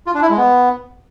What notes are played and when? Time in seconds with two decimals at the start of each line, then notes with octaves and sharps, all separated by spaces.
0.06 F4
0.14 D4
0.22 E4
0.30 G#3
0.37 B3